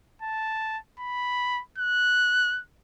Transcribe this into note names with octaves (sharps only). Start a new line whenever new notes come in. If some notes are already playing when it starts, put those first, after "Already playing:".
A5
B5
F#6